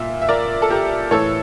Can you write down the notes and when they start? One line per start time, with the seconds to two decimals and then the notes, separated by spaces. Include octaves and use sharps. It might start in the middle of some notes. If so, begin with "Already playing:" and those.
Already playing: A#2 E5
0.22 E5
0.29 A#4 D5
0.62 A4
0.70 G4 A#4
1.11 A2 E3 A4 C#5